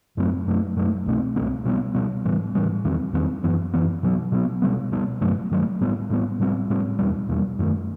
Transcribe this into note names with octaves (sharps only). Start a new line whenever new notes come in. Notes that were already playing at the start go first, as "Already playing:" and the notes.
F#2 F#3 A3 C4
F#2 F#3 A3
F#2 F#3 A3
C2 B2 A3 C4
C2 B2 A3 C4
B2 G3 B3
B2 G3 B3
A2 E3 G3
A2 E3 G3
E2 D#3 G3 C4
E2 D#3 G3 C4
F#2 E3 B3
F#2 E3 B3
B2 F#3 B3
B2 F#3 B3
B2 G3 B3
B2 G3 B3
G2 D#3 F#3 A3
G2 D#3 F#3 A3
A2 G3 B3
A2 G3 B3
A2 G3 C4
A2 G3 C4
E2 B2 G3
E2 B2 G3
F#2 D#3 A3